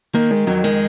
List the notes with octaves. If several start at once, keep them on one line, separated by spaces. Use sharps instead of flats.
D#3 A#3
D#3 G#3
F2 F#3
D#3 G#3